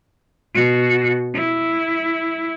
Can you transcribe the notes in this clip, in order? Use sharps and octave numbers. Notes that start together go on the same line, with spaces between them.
B2 F#4
E4